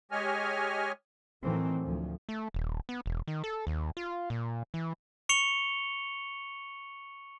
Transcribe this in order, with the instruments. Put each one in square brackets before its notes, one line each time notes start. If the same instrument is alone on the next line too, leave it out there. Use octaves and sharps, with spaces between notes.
[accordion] G#3 G4 C#5 D#5 G#5 F6
[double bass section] A2 D#3 E3 F#3 A3 C4
D2 F3
[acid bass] A3
D#1
B3
E1
D#3
A4
D#2
F4
A#2
E3
[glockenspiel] C#6 C#7 F7 G7